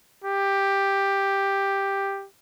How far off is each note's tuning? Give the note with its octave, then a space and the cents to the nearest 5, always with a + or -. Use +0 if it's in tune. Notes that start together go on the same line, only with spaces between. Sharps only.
G4 +5